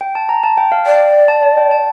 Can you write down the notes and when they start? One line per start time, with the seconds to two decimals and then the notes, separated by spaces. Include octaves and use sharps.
0.01 G5
0.15 A5
0.29 A#5
0.43 A5
0.57 G5
0.72 F5
0.86 D5 G5
1.28 A5
1.43 A5
1.57 G5
1.71 A5